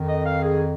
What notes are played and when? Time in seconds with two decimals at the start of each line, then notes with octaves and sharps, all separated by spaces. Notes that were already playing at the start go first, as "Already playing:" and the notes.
Already playing: F2 D#3
0.09 D#5
0.25 F5
0.42 G#4